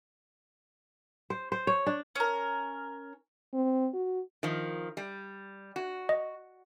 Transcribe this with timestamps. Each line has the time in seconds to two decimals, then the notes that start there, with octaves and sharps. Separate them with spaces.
1.30 C5
1.52 C5
1.67 C#5
1.87 D4
2.16 C#4 A#4
3.53 C4
3.94 F#4
4.43 D#3 F3
4.97 G3
5.76 F#4
6.09 D#5